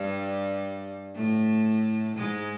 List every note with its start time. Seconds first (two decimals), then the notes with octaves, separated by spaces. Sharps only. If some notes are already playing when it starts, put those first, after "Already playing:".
Already playing: G2 G3
1.15 A2 A3
2.16 G#2 G#3